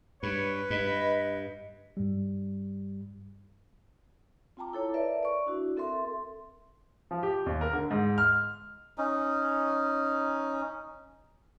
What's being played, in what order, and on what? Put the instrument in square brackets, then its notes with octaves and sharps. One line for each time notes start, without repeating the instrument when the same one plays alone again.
[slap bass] G2 [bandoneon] B4 [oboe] C#5
[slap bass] G2 [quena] D#5 [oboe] B5
[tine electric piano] G2 G3
[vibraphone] C4 F4 G5 A5 A#5 D6
E4 A4 C#5 A5
A#4 B4 D5 E5
D5 C#6
D4 E4 F#4
C4 A4 A#4 E5 C6
[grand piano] F3
G4
D#2
A#4
D3
G#2
F6
[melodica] C#4 D#4